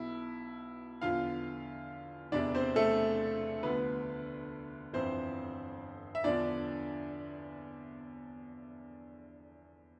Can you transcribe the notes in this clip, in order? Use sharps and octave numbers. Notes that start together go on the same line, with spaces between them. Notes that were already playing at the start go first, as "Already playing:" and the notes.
Already playing: B1 B2 E4
E2 D3 F3 F4 F5
E1 E2 C3 D4 D5
C4 C5
A3 A4
D2 D3 F3 B3 B4
G1 F2 E3 C4 C5
E5
E2 D3 F3 D4 D5